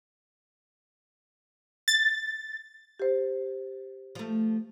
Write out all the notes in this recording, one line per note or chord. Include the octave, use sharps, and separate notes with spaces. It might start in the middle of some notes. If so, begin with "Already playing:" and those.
A6
G4 C5
F3 A3